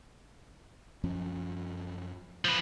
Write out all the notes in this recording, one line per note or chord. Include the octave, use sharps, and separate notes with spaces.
F#2 F3 C#4
F3 B4